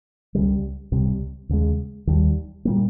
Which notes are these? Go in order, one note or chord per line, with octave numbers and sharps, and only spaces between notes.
C#2 C#3 G3
C#2 C3 G3
D#2 C#3 G#3
D#2 D#3 G3
A#2 G3 A#3